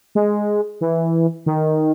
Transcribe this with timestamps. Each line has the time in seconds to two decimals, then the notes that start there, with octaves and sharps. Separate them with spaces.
0.15 G#3
0.81 E3
1.46 D#3